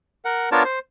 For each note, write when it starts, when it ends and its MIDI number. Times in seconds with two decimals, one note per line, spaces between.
0.25 0.49 70
0.25 0.49 78
0.52 0.63 59
0.52 0.63 62
0.52 0.63 65
0.52 0.63 70
0.52 0.63 73
0.52 0.63 81
0.65 0.79 72